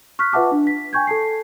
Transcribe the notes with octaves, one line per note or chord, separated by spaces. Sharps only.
C#6 F6 F#6 B6
F4 B4 E5 F#5 A5 D6
D4
B6
G5 G#5 C#6 G6 G#6
A4 A5 C7